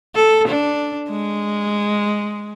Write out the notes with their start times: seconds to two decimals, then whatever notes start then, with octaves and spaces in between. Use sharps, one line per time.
0.16 A4
0.48 D4
1.10 G#3